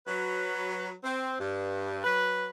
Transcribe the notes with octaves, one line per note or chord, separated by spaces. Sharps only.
F#3 B4
C4
G2
F#3 B4